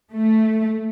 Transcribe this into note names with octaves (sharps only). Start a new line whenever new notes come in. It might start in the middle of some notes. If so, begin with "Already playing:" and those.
A3